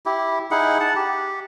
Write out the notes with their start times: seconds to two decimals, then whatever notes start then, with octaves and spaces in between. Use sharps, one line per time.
0.06 E4 G4
0.51 D#4 E4 G#4 F#5
0.80 F#5 A5
0.96 G4